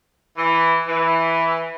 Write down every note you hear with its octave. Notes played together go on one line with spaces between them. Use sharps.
E3
E3